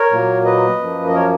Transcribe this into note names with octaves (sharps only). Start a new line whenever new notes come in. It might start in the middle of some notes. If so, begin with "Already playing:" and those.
Already playing: A#4 C#5
A#2 F#3 A#3
B4 D#5
F#2 F3 A#3
D#5
A#4 C#5